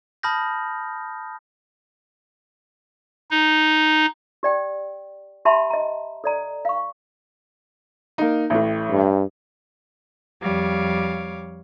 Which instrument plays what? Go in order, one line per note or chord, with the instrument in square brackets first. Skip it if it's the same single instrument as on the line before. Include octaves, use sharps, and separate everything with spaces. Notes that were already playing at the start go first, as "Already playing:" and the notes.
[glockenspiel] A5 B5 D#6 F6 G6 A#6
[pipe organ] D#4
[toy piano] G4 D5 G5
G4 E5 F#5 A5 B5 C6
D#5 A#5
A4 D5 A#5
F5 C#6
[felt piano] A#3 D#4
A1 A2
[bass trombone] G2
[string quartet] F2 G3 C#5 F5 D6